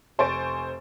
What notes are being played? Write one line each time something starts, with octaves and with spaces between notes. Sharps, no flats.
F1 C5 G#5 C#6 A6 D7